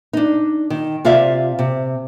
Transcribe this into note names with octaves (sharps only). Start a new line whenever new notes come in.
D4 D#4
D#3
C3 F4 D5 E5 F5
C3